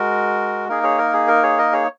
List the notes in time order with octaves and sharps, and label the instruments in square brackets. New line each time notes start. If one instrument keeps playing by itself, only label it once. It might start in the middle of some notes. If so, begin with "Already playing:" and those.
Already playing: [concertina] G#3 F#4 A#4
A#3 D#4 G#4 A#4
G#4 C#5
A#4
G#4
A#4
G#4 C#5
A#4 D#5
G#4 C#5